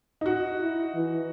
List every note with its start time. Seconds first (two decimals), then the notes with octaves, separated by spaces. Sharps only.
0.21 D#4 F#4
0.61 E4
0.95 E3